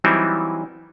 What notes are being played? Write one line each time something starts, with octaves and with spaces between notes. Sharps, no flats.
E3 F#3 G3 C4 D#4 E4